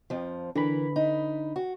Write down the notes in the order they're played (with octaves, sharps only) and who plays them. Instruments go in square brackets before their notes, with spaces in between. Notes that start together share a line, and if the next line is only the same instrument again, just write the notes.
[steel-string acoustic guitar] F2 F3
[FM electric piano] D3 B5 [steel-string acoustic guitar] E3 A#4
[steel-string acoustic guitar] D#4
F#4